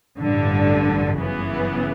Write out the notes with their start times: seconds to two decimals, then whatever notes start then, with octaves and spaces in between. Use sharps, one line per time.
0.20 A1 G2 D3
1.18 G1 F#2 C#3 E3 B3